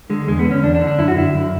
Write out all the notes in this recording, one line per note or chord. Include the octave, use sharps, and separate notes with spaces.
D3 G#3
E2 G#3
B3
D3
C#4
E2 D4
D4
D3
D4
F#2 E4
F#4
D3 E4
F#2